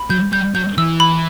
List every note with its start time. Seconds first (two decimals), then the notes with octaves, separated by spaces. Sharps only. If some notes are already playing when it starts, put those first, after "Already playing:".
Already playing: B5
0.10 F#3 G6
0.32 G3 G6
0.55 F#3 G6
0.78 E3 E6
1.00 B5